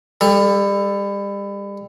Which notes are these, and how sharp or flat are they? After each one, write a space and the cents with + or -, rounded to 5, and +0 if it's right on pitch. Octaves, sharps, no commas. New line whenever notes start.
G3 +35 A4 +0